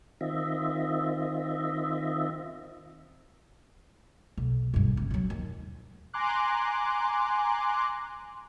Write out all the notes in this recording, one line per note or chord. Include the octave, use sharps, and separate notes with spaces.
D#3 C4 F4 D#5 E5
B1
B1 G2
C#3
E3 F#3
D#2
G#5 A#5 C6 D6 F#6